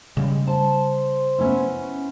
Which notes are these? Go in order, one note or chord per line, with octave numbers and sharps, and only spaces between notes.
C#3 G3 G#3
C5 A5
B3 C#4 E4